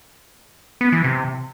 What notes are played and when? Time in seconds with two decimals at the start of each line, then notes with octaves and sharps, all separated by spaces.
0.81 B3
0.92 E3
1.04 C3